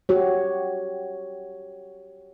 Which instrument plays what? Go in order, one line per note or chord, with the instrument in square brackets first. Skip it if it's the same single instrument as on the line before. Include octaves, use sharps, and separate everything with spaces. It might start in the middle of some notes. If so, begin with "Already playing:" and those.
[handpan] F#4 G4 C#5